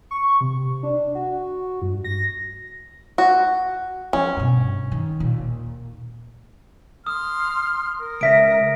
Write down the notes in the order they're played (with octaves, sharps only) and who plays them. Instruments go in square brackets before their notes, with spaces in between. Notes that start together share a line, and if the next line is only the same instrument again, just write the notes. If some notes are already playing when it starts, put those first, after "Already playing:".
[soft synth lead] C#6
C3
D4
F#4
G2
A#6
[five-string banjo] F#4
[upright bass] F3 [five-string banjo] C#4
[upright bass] G2 B2
D#3
D#2 A#2
[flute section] C6 F6 [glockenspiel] D#6
[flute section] A#4
[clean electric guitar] C#2 E5 [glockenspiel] A#6 B6 D7